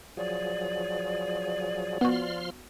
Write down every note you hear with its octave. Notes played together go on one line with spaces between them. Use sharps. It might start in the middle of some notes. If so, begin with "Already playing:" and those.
F3 F#3 G#4 D5
F3 B3 F#4 C6 F6